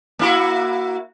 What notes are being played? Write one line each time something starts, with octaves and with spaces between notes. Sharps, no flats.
A#3 E4 F#4